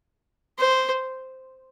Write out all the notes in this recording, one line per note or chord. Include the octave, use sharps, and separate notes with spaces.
C5